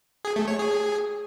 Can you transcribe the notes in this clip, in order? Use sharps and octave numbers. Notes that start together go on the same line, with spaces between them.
G#4
A3
C#5
G#4